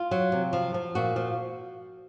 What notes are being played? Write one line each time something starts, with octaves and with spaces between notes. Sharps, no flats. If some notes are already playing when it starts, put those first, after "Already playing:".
Already playing: F4
F#3
C3
F3
F3
A#2 F#4
F3